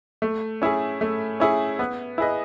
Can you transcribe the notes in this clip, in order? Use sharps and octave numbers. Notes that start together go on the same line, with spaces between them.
A3
C#4 E4 G#4
A3
C#4 E4 G#4
B3
E4 G#4 B4 D#5